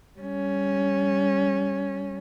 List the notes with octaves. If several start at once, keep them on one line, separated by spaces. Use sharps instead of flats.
G3 C#4